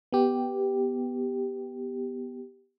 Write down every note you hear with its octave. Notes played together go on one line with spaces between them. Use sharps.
B3 G4